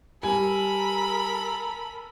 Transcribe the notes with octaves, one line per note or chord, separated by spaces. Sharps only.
G3 A4 A#4 G#5 B5